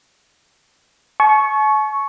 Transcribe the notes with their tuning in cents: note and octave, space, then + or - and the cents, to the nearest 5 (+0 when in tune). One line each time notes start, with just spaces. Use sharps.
A5 -45 C#6 +0